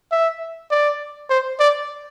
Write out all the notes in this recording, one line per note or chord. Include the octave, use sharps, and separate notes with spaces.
E5
D5
C5
D5